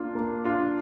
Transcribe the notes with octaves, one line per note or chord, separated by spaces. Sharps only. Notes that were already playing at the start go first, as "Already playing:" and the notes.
Already playing: A#3 D4 F4
A#3
D4 F4